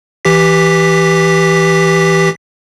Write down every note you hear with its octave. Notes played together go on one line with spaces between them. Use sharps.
E3 G4 B6